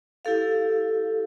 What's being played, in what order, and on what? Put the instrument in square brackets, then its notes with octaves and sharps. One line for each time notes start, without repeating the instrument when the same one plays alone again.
[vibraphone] E4 G4 A4 F5